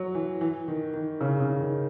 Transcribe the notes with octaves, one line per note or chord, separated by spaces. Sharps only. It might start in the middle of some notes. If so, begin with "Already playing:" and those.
Already playing: F#3
E3
E3
D#3
D#3
C#3
C#3
D#3